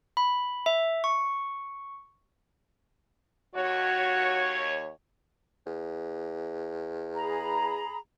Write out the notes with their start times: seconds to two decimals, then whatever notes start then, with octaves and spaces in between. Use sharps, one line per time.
0.17 B5
0.66 E5
1.04 C#6
3.56 D#2 F#4 C#5
5.67 E2
7.15 G#4 A#5 B5